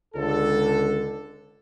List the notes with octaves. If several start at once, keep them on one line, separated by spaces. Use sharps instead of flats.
C#2 D3 A4